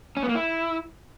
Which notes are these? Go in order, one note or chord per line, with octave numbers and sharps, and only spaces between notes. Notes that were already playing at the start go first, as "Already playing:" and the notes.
C#4
B3
A#3
E4